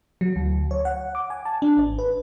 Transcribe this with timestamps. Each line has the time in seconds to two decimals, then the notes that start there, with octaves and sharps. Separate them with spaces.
0.21 F#3
0.36 D2
0.71 C#5
0.85 F#5
1.15 D6
1.30 G#5
1.45 A5
1.62 D4
1.77 G#1
1.99 B4